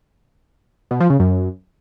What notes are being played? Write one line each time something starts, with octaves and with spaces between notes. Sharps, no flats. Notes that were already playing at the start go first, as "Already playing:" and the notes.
B2
F3
C#3
F#2